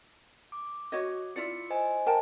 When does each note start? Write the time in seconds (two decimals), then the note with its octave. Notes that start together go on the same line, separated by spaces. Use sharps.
0.52 D6
0.92 F#4 C#5 D#5
1.36 E4 F4 D5 C#7
1.70 C5 D#5 G#5
2.06 A#4 G5 A5